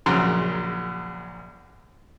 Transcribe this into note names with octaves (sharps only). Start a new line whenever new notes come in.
A#1 F#2 C#3 A#5 C6